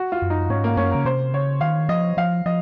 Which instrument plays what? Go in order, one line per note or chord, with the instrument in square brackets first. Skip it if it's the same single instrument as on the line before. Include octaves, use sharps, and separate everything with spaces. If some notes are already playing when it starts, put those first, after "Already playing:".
Already playing: [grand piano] F#4
F4
[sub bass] F#2
[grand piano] D#4
[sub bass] G#2 [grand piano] C#4
[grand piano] A#3
[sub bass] F#2 [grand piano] C#4
[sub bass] C#3 [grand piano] A#4
[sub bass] C3 [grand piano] C5
[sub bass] C#3 [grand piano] C#5
[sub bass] D#3 [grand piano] F5
[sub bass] F3 [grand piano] D#5
[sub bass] F3 [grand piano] F5
[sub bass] F3 [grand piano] D#5